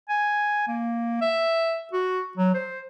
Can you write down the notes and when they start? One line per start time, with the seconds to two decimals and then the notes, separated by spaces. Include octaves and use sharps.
0.09 G#5
0.68 A#3
1.21 E5
1.93 F#4
2.38 F#3
2.54 C5